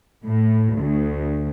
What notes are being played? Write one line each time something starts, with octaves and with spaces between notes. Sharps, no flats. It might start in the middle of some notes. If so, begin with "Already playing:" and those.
A2
D2